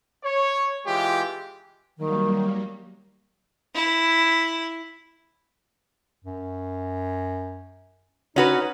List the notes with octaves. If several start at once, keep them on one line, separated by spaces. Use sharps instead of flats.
C#5
E3 G#3 F4 G4
D#3 F#3 G3 A#3
E4
F#2
C#4 D#4 F#4 B4